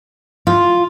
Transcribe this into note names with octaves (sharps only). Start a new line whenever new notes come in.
F4